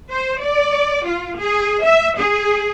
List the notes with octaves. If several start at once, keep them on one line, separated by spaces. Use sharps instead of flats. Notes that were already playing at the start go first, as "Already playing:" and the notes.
C5
D5
F4
G#4
E5
G#4